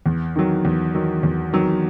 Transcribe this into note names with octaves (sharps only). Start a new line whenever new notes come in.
E2
D#3 F#3
E2
D#3 F#3
E2
D#3 F#3